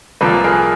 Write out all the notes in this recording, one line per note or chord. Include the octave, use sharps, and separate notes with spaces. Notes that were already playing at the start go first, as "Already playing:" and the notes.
C2 A#2 F3 A#3 A4 B4
G#4 A#4